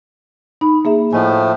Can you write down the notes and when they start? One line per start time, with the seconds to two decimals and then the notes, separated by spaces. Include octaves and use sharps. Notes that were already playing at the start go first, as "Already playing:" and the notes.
0.61 D#4 B5
0.85 A#3 G#4 E5
1.13 A2 F3 A3 D#5 G#5